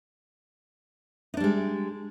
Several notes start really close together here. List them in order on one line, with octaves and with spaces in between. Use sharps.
D#4 D4 G3 G#3